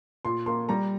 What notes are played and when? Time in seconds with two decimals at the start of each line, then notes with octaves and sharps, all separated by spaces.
0.25 A#2 C6
0.46 A#3 C6
0.69 G3 A#5